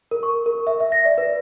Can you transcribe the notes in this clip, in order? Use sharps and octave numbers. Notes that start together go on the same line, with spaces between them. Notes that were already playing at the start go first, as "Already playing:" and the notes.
A#4
C#6
A#4
E5
E5
A#6
D5
B4